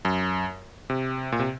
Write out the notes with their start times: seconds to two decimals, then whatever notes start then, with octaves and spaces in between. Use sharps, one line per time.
0.05 F#2
0.90 C3
1.32 A#2
1.40 C3